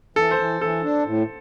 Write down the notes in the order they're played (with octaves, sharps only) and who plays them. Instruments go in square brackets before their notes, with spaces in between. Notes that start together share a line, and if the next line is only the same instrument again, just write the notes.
[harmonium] E3 [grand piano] A4
[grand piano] C5
[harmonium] E3
[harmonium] E3 [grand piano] A4
[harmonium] D4
A2